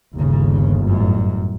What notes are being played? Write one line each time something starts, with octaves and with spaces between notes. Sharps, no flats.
G1 D#2 C#3
A1 F#2